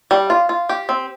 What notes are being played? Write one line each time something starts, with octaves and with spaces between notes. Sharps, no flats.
G3
F4
F4
G4
C4